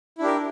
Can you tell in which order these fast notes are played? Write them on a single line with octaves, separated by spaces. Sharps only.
E4 D4 G4 A#4